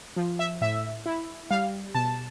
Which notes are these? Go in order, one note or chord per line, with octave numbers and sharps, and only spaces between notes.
F3
E5
A2 E5
E4
G3 F5
B2 A5